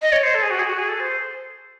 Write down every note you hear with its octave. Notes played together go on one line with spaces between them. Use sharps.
D#5
C#5
C5
A4
G#4
F#4
G#4
F#4
G#4
A4
C5